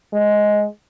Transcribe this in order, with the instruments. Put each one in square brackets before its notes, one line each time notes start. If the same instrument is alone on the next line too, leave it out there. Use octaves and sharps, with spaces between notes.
[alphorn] G#3